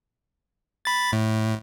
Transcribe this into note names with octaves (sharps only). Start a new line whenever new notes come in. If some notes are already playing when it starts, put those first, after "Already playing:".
B5 A6
A2